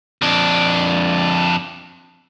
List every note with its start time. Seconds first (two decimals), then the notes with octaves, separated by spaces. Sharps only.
0.22 F2 D4